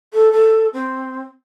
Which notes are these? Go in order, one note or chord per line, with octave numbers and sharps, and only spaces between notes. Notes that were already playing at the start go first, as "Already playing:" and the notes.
A4
A4
C4